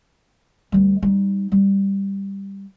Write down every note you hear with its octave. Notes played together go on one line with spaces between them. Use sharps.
D2 G3
G3 D#4
G3